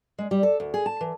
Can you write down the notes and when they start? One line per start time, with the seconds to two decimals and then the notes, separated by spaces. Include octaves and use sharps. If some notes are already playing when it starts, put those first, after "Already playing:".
0.18 G#3
0.31 G3
0.43 A4
0.60 D2
0.74 G#4
0.86 A5
1.01 E3